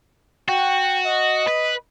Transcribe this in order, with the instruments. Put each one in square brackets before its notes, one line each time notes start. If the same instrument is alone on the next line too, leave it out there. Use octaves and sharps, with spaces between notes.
[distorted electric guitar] F#4 [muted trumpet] G5
[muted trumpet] D#5
[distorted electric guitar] B4